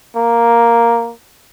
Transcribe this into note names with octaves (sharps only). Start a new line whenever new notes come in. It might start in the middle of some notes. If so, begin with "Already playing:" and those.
A#3